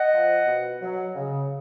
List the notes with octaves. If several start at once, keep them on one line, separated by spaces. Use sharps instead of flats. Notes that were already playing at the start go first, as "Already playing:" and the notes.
Already playing: D#5 F#5
F3
B2
F#3
C#3